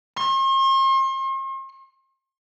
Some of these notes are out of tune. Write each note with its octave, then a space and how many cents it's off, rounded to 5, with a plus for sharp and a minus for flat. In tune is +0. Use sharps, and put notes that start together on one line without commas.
C6 +45